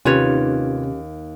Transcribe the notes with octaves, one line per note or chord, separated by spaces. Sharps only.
D#2 C3 C#4 F4 G4 B4 C#5